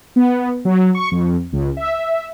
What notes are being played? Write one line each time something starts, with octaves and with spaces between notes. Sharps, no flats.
B3
F#3
C#6
F2
C#2
E5